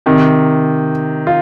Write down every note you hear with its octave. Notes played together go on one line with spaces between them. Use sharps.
C3 D#3
F4